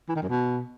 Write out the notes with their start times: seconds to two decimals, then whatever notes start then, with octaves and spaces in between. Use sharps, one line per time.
0.09 E3
0.15 D#3
0.22 F#2
0.29 B2